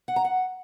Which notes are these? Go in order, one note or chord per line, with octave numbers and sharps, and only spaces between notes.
F#5
A#5
F#5